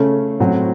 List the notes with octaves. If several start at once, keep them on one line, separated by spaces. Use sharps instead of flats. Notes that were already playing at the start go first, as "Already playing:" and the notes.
Already playing: C#3 A3 C#4 A4
A2 F#3 C4 F#4